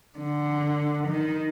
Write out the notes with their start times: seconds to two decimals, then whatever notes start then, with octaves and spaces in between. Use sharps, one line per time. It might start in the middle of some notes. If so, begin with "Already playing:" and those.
0.19 D3
1.08 D#3